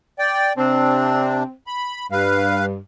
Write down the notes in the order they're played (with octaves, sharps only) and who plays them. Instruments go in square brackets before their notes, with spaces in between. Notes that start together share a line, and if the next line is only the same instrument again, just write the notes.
[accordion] D5 G5
[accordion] C3 D4 [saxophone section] C4
[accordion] B5
[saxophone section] G2 [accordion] B4 F5